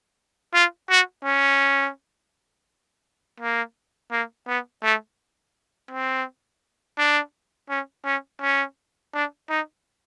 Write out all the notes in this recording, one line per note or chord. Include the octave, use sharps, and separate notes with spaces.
F4
F#4
C#4
A#3
A#3
B3
A3
C4
D4
C#4
C#4
C#4
D4
D#4